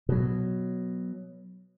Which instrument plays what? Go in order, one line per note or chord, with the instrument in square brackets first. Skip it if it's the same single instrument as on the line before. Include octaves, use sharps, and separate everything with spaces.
[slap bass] B2 F#3